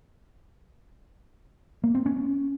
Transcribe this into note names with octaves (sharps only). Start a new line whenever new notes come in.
A#3
C4
C#4